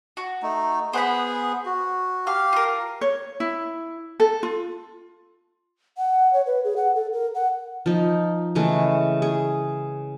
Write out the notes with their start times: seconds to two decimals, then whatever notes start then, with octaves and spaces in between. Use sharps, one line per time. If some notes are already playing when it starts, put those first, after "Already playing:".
0.17 F#4
0.42 A3 D#4
0.93 B3 G#4 C5 F#5 B5
1.65 F#4
2.27 G4 F5 F6
2.53 F4 A#4
3.01 C#5
3.40 E4
4.20 A4
4.43 F4
5.98 F#5
6.33 C#5
6.46 B4
6.64 G#4
6.77 F#5
6.95 A4
7.13 A#4
7.35 F#5
7.86 F3 D#4
8.55 C#3 E3 G#3 A3
9.22 G#4